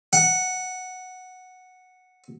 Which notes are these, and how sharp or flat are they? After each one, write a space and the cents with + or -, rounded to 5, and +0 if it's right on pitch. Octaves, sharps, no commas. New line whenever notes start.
F#5 -5